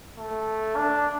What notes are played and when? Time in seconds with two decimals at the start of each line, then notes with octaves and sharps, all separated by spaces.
0.18 A3
0.76 D4